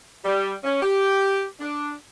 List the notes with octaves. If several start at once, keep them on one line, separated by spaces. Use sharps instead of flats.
G3
C#4
G4
D4